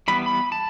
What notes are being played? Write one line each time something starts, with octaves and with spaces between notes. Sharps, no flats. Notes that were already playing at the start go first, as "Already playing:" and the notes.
E3 G3 B3 B5
B5
A5